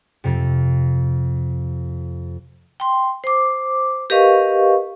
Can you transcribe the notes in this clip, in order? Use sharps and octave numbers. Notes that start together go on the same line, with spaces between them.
F2 C3
G5 C6
C5 D6
G4 A#4 B4 D#5 F5 C#6